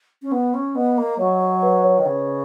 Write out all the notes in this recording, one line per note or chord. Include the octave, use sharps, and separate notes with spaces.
C#4
B3
C#4
B3 D#5
A#3
F#3 C#5
C#5
B4
C#5
D#3
C#3